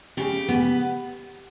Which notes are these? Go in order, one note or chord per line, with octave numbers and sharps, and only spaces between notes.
C#3 G4
B3